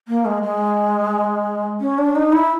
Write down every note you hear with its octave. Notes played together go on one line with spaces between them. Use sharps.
A#3
G#3
G#3
C#4
D4
D#4
E4